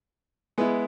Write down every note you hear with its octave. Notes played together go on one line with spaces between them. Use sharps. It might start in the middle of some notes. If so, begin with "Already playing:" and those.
G#3 B3 E4